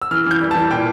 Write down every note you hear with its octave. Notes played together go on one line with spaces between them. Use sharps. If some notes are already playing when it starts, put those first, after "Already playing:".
E6
E3 F6
E3 G6
G3
E3 A5
A#2 G5